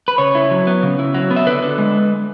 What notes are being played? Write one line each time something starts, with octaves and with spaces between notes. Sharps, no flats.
B4
C#3 C#5
E4
F#3
B3
C#3
E4
F#3
B3
E5
D3 B4
D3
G#3